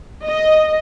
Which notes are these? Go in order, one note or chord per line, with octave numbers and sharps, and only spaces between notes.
D#5